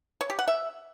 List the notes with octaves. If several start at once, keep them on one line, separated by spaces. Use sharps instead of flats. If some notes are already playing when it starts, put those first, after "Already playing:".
C#5
G4
F#5
E5